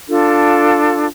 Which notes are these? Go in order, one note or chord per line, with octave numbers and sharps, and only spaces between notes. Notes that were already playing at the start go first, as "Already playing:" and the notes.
D4 F4 A4